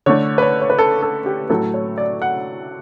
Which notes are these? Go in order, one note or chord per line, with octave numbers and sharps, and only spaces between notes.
D3 A3 C#5
B4
C#5
C#5
B4
A4
A4
G4
A2 F#3 A3 A4
C#5
D5
F#5